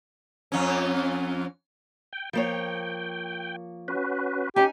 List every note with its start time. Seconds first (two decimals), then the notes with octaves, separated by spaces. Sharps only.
0.52 F2 C#4
2.13 G5
2.33 F3 A#3 C#5 G5
3.88 C#4 F#4 B4
4.56 C#4 D#4 G4 G#5